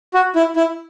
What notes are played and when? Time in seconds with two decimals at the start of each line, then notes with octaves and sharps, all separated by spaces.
0.14 F#4
0.36 E4
0.56 E4